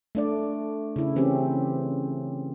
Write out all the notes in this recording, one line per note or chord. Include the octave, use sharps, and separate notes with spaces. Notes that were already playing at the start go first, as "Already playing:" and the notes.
A3 D4 D5
C#3 E4
E3 C4 C#4 G4